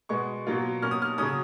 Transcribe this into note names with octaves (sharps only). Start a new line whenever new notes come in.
B2 G#3 B3 C#6
B2 F#3 A#3 F4
B2 A#3 C#4 F6
D#6
F6
C#3 F#3 C#4 D#6